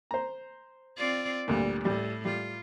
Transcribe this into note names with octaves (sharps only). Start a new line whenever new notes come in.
C5 A#5
C4 F4 D5
D2 A#2 G3
A2 G3
G3 F4